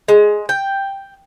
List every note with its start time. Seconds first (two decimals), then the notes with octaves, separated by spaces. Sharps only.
0.08 G#3
0.49 G5